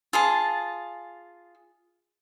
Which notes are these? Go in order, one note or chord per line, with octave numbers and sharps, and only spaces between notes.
F4 G#4 A5